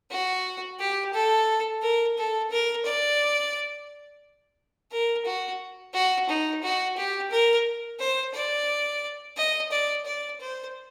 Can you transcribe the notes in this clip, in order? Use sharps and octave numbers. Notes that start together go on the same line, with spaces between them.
F#4
G4
A4
A#4
A4
A#4
D5
A#4
F#4
F#4
D#4
F#4
G4
A#4
C5
D5
D#5
D5
D5
C5